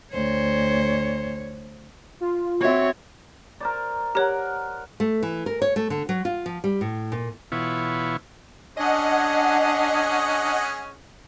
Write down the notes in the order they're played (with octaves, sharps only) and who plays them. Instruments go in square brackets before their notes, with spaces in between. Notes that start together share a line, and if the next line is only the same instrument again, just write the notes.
[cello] D2 C#5 [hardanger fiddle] C5
[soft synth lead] F4
[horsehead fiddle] C4 C#5 [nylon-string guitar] F#4 E5
[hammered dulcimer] A#4 C5 D5
[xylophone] G4 C#5 [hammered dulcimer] A#4 F#5
[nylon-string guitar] A3
E3
A#4
C#5
A3
D3
F#3
F4
F3
G3
A2
A#2
[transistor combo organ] B2 E3 B3 E4 F4 C#5
[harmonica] C#4 G#4 [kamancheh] D4 [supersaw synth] D#5 F#5